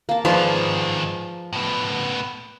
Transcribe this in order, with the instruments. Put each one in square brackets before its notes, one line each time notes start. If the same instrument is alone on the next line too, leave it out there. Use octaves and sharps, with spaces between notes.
[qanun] A#3 A5
[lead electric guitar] G#2 D#3 [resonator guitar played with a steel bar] F3 [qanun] G#4 B4 D5
[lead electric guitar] A2 B3